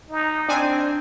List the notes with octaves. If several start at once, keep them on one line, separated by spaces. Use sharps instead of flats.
D#4
C4 D4 G#5